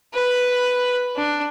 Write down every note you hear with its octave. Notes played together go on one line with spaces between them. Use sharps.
B4 B5
D4